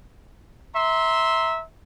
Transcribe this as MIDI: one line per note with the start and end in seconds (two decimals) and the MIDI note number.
0.75 1.61 76
0.75 1.61 82
0.75 1.61 84